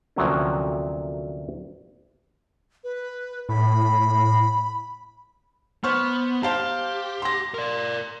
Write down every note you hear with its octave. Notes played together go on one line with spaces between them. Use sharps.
D2 C3 F3 F#3 A#3 C#4
B4
A2 B5
B3 C5 C#6 F6
G4 C5 F5 A5
C6 A#6
A#4 D5